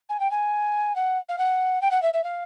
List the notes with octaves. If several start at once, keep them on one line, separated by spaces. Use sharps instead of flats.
G#5
G5
G#5
F#5
F5
F#5
G5
F#5
E5
E5
F5